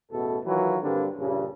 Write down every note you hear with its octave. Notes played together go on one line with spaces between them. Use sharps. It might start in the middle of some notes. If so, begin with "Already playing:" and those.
A1 E2 B2 A3 A4
D#3 E3 F#3 F4 B4
G2 D3 G3 A#3 C4 D4
A#1 G2 C#3